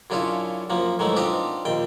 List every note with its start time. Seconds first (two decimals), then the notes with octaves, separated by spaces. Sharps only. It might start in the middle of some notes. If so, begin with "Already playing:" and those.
0.10 F#2 C#3 D4 E4 F4
0.70 F#2 F3 A#3
0.99 G#2 D#3 E3 F#3 A3
1.17 C4 D4 D#4 F4 G4 D5
1.65 A#1 D#2 G5